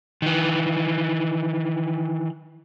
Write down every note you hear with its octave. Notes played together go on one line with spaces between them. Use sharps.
D#3 E3